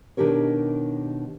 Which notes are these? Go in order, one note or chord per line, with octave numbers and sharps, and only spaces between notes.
B2 D#3 D4 G4 A#4 C#5